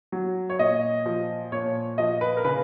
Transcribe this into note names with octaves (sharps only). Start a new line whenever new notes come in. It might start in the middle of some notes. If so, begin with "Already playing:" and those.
F#3
C#5
A#2 D#5
F3
A#2 C#5
F3 D#5
B4
A#4
C#3 B4